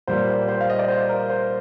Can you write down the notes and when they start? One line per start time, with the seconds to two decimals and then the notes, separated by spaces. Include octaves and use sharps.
0.08 A#2 G3 A#3 C5
0.48 C5
0.61 F5
0.70 D#5
0.79 D5
0.88 C5
1.09 A#4
1.30 C5